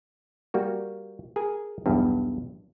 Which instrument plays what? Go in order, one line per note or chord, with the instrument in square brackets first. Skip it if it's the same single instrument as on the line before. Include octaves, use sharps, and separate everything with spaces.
[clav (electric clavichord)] G3 A#3 F#4
G#4 A#4 G#5
B1 E2 G2